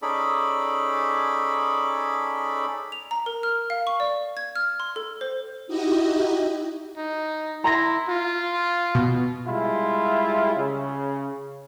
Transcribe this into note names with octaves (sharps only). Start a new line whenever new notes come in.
C#4 D#4 G#4 A4 D5 B5
F7
A#5
A#4
F6
F5
C#6
D5
G#6
F6
C6
A4
C5
D#4 E4 F#4 G4 D#5
D#4
E4 A#5 C6 A#6
F4
B2
G3 G#3 E4 F4
C#3